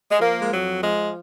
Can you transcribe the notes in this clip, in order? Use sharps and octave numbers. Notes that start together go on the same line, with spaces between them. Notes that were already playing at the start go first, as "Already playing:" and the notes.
G#3
F3 A#3
G#3
F2 F#3
F3 G#3